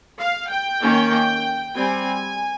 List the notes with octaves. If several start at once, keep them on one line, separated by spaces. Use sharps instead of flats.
F5
G5
D#3 A#3 C#4
G3 C4 G#5